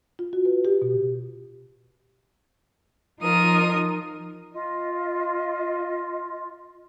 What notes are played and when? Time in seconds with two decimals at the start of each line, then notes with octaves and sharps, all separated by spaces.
0.19 F4
0.33 F#4
0.45 B4
0.65 G4
0.82 B2
3.20 F3 D#4 F4 A#4 D#6
4.52 F4 D#5